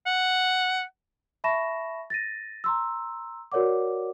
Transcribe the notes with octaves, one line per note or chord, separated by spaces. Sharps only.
F#5
E5 A5 B5 C#6 A#6 E7
A6 A#6 D#7
A#5 C6 E6
F#4 A#4 C#5 D5 F#5 D6